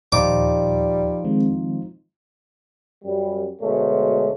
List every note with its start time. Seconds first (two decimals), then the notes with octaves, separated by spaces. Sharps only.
0.12 D#2 A#2 F3 G3 D#4 F4 D6
1.24 D#3 G#3 C4
3.05 F#2 G3
3.62 D2 B2 G#3 A3 C#4